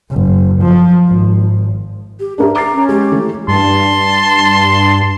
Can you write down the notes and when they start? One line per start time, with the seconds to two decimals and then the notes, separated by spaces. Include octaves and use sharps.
0.11 F#1
0.62 F3
1.08 G#1
2.20 G4
2.38 D4 G4 A#4 E5
2.56 A#5 D6 A6 C7
2.73 C#4
2.89 G#3 G4
3.12 E3 A3 E4
3.48 G2 A5 C6